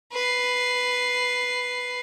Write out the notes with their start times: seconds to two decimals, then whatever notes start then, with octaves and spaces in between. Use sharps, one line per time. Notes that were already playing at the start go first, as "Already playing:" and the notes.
0.13 B4 C7